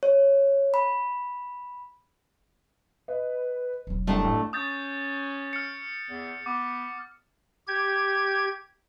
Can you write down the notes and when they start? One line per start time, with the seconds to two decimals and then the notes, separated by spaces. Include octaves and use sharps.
0.03 C#5
0.74 B5
3.08 B4 D#5
3.87 E1 F#3
4.07 C2 F#2 G3 A3 D4 F#5
4.25 A1
4.53 C#4 D#6 G6 A6
5.53 F6 C#7
6.10 E2
6.46 B3 D6
7.67 G4 G#6